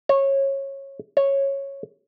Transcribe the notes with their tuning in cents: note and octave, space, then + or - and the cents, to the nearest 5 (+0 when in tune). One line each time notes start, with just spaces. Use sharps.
C#5 -20
C#5 -10